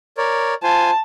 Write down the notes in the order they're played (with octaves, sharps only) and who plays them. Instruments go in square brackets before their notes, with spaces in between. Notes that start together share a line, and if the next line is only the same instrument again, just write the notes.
[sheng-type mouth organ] A#4 C#5 D5
[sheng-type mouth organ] F4 C5 G#5 [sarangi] A5